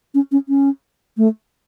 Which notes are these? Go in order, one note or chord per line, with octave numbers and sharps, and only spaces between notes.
C#4
C#4
C#4
A3